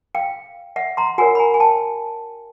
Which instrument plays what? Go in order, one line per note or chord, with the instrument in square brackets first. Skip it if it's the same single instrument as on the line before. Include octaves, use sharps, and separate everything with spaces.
[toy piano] F5 G5
E5 F#5
A#5 C6
F#4 A#4 C#5 F#5 G#5
B5
G#5 A#5
G#5
G5 A5